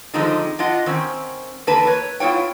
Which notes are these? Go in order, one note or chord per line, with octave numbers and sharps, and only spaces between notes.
D3 D#3 F3 G#3 C4 D#4
D4 F4 D#5 F#5
D#3 C4 C#4
E2 D3 A#3 B4 A5
B4 C#5
B3 E4 F4 C#5 G5